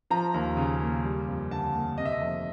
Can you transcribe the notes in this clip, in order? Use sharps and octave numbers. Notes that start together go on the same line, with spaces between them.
F3 A#5
D#2
C#3
A#3
G3
F2
D3 A5
A#3
C3 D#5
E5
D#5
F1